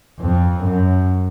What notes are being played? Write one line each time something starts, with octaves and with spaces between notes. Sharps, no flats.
F2
F#2